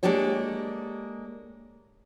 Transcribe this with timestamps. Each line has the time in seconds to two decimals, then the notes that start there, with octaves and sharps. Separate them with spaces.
0.03 G#3 A#3 D4 G4 A4 C#5